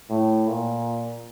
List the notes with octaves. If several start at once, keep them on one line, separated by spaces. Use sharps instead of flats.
A2
A#2